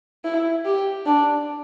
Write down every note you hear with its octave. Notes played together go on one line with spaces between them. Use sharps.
E4
G4
D4